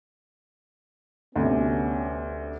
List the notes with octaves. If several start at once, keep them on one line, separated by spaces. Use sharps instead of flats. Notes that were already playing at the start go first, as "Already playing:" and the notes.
D2 C3 B3 C#4 G4